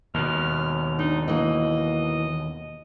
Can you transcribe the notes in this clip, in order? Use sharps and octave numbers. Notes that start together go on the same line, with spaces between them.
D#2 B2 F6
D4 D#4
E3 A#3 D#5